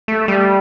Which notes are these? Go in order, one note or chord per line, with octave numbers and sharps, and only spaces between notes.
A3
G3